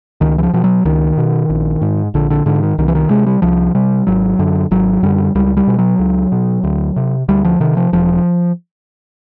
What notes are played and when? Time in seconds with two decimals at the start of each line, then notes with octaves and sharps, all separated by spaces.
0.21 C#2 D#3
0.38 E3
0.43 F3
0.53 B2 F3
0.64 F#3
0.85 C#2 D#3
1.18 B2
1.49 A#1
1.81 G#2
2.14 A#1 D3
2.30 D3
2.46 G#2 D3
2.63 D#3
2.78 C2 D#3
2.88 E3
2.95 D#3
3.10 C3 G#3
3.26 G3
3.42 C2 F3
3.75 C3 G3
4.07 G#1 F#3
4.39 F#2 D3
4.71 G#1 F#3
5.03 F#2 D3 G3
5.35 C#2 G3
5.57 G3
5.67 B2
5.79 F#3
5.99 C#2
6.32 B2
6.64 D2
6.96 C3
7.29 D2 G3
7.44 F3
7.60 C3 D#3
7.77 F3
7.93 E1 F3